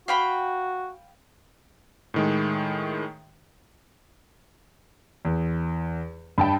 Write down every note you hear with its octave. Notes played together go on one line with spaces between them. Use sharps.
F#4 F5 G5 B5
A2 D#3 G#3
E2
G2 G5 A5 B5